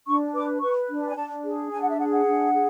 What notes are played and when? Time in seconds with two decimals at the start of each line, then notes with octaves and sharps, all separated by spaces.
0.07 D4 C#6
0.34 B4 D6
0.61 B4 C#6
0.90 D4
1.08 G#5
1.16 D4 A5
1.44 G#4
1.71 D4 G#5
1.80 F#5
1.89 E5
1.98 G#4 F#5
2.12 F#5
2.27 D4
2.54 G#4